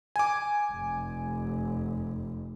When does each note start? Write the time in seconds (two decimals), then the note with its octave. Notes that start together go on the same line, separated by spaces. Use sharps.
0.16 G#5 D6
0.72 F1